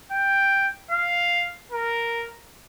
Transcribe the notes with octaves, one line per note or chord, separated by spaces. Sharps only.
G5
F5
A#4